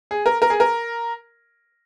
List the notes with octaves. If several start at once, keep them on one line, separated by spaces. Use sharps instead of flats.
G#4
A#4
A#4
G#4
A#4